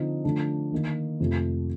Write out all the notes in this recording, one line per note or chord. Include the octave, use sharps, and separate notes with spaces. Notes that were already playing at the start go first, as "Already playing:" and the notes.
Already playing: D3 F3 C4 D#4
D3 F3 A3 D4
D#3 A#3 D#4
F2 C3 F3 A3